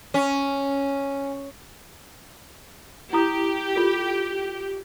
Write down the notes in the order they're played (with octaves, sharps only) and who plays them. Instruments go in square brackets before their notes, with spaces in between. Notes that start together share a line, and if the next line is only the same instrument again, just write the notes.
[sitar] C#4
[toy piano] E4 A#5 D#6 [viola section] G4
[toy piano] F4 A4